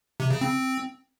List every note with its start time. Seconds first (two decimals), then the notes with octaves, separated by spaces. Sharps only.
0.20 C3
0.31 C#3
0.41 C4